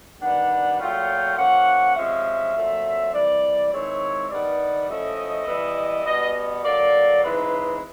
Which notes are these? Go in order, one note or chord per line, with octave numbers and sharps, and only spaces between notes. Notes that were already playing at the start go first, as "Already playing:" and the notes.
D#3 G3 B3 D4 F#5
A#2 F#3 A3 C#4 F4 G5
F3 A#3 C#4 F#5
C3 F3 G#3 C#4 E5
A#2 F#3 A3 C4
C3 E3 G3 D5
D#3 G#3 C4 E4 C#5
G2 D#3 G3 B3 D5
F3 A3 C#4 E4 D#5
E3 G3 B3 E4
B2 G3 B3 D#5
D#5
D3 F#3 A#3 D5
C#3 E3 G#3 C4 D#4 B4